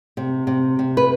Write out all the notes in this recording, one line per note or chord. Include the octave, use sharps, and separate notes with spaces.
C3
C3
C3
B4